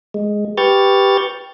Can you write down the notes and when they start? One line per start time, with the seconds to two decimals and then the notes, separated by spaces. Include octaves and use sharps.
0.14 G#3
0.58 G4 B4 C#6 F6 G6 A6